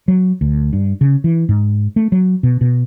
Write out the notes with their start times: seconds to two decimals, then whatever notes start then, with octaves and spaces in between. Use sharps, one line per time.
0.08 F#3
0.41 D2
0.73 G2
1.01 C#3
1.24 E3
1.49 G#2
1.96 A3
2.12 F#3
2.43 B2
2.61 B2